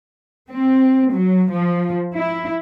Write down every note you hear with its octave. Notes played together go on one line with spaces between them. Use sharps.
C4
F#3
F3
E4